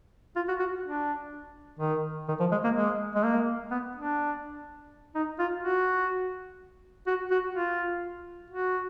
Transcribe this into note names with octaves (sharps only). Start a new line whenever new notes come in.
F4
F#4
F#4
D4
D#3
D#3
F3
G#3
A#3
G#3
G#3
A#3
B3
D4
D#4
F4
F#4
F#4
F#4
F4
F#4